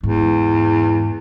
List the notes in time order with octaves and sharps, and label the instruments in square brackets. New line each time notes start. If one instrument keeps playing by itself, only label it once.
[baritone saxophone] E2 [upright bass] G#2